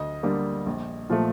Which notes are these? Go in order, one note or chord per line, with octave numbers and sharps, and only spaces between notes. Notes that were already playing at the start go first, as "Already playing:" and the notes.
Already playing: D2 D#5
D3 G3 A#3
A#1
A#2 F3 A3